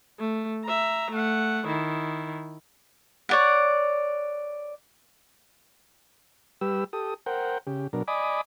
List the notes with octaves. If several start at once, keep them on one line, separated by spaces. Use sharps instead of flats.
A3
E5 A#5
A3 F#5
D#3 E4
C#5 D5 F#5
G3 G4 B4 E6
G4 A4 D#6
A#4 C5 F#5 G5
C#3 G4
B2 F#3 D4 A#4
D5 D#5 G#5 B5 D6 D#6